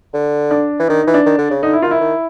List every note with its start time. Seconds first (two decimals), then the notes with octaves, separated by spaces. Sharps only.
0.14 D3
0.51 D4
0.79 E3
0.88 D#3 D4
1.01 D#4
1.07 E3
1.14 D4
1.26 D#3
1.38 D3
1.51 C#3
1.63 D3 D#4
1.73 E4
1.82 D#3 F4
1.91 E4
2.01 D#3